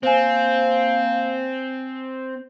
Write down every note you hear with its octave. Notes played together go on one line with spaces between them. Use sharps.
A#3 C4 C5 G#5